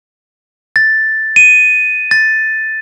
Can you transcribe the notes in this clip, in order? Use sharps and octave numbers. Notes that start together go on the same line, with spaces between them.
A6
D#7
A6